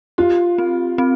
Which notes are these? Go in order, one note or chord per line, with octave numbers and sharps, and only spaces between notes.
F4 G4
C4
C4